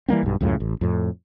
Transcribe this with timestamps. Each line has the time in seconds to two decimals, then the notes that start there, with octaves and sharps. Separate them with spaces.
0.08 E3 G3 A#3 C4
0.23 B1 G2
0.41 C#2 F#2 A2 C#3
0.60 A1
0.81 F2 A2